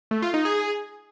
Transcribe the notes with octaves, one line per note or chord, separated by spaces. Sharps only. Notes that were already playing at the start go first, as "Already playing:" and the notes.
A3
F4
D#4
G#4